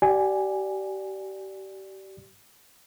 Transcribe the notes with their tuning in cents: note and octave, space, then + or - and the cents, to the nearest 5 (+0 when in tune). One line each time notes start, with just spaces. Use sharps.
G4 -35 D5 +0 G#5 +0